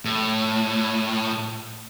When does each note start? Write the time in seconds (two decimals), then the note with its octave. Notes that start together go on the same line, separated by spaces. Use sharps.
0.05 A2